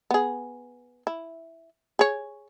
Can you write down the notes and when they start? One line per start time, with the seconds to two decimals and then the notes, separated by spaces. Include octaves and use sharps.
0.11 B3 G#4
1.07 E4
1.99 G#4 C#5